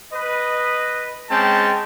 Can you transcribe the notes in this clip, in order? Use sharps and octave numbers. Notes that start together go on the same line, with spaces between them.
B4 D#5
G#3 C4 C#4 G5 A5